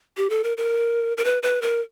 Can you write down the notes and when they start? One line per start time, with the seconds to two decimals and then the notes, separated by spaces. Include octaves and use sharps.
0.17 G4
0.30 A4
0.44 A#4
0.57 A#4
1.17 A#4
1.25 B4
1.43 B4
1.62 A#4